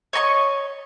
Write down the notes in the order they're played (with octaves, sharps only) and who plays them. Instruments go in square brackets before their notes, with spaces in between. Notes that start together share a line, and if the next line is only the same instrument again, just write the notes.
[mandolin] C#5 D#5 A#5 C#6